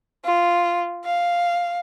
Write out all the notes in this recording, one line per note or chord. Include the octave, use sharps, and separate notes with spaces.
F4
F5